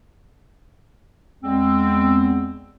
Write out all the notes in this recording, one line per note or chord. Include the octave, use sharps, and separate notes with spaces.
E2 G#3 C4